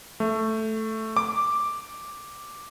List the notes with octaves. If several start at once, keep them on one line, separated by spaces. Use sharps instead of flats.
A3
D6